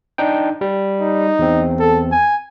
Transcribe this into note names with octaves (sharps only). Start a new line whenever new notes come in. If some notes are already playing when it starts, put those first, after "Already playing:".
D4 D#4 G5
G3
D#4
E2 C4
A4
G#5